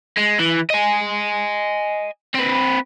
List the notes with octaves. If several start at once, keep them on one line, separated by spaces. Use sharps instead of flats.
G#3
E3
D#5 G#5
C4 B4